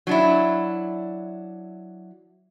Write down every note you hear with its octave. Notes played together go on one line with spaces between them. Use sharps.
F#3 D4 E4